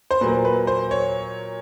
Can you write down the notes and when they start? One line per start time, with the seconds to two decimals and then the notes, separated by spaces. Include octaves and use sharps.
0.11 C5
0.21 A#2 F#3 A#3 B4
0.45 B4
0.67 C5
0.91 C#5